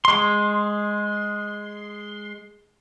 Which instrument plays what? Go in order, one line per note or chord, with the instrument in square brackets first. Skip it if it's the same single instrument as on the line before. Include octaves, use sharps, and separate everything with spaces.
[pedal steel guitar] G#3 C6